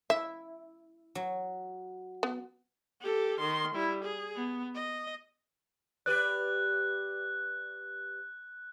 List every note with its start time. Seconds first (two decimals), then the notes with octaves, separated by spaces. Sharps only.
0.10 E4 E5
1.15 F#3
2.23 B3
3.01 G4 A4
3.40 D#3 C6
3.75 G3 E4
4.04 G#4
4.36 B3
4.75 D#5
6.06 G4 B4 D5 F#6